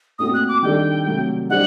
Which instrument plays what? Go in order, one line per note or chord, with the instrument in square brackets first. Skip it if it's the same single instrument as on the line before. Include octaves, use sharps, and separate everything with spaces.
[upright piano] A#2 A3 C4 F#4 [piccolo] D#6
[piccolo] F#6
D6
[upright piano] D#3 G3 D4 A4 [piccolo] G5
[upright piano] C3 F#3 A3
[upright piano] G3 D4 G4 C5 [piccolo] F#5